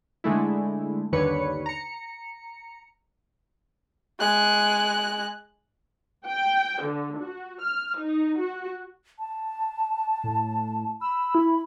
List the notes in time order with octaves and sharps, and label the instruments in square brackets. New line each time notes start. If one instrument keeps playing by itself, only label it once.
[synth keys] D3 G#3 A3 E4
G1 D#2 D3 B4 C#5 C#7
A#5 C#7
[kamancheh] G#3 F#6
[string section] G5
D3
F#4
F6
D#4
F#4
[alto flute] A5
[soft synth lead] A2
[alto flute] B5 [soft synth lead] E6
[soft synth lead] E4